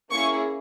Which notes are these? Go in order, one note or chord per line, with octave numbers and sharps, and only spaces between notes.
A#3 C#4 E4 G#4 C#6